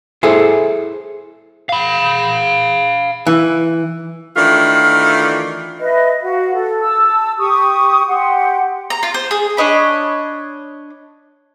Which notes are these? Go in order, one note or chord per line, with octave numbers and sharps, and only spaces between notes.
E4 G#4 A4 C5
F5 B5
E3
D#3 E3 A3 D4 F4
B4 D#5 E5
F#4 F5
A4
A5 E6
G4 C#6 D#6
G4 F#5 C6
A#5
F4
C5
G#4
D4 C#5 D#5 B5